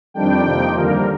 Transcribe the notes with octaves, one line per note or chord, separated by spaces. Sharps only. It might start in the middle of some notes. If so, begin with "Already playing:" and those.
F2 D#3 G3 D4 G5
F2 C3 F3 A#3 D#4
D#2 D3 G3 A#3 A#4